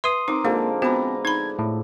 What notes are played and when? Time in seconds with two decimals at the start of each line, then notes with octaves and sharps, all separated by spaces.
0.04 B4 E5 C6 D#6
0.28 C4 D#4 A#4 D6
0.45 D3 F3 G#3 A#3
0.82 B3 C4 F#4 B4 A#5
1.25 D#4 B5 G#6
1.59 A2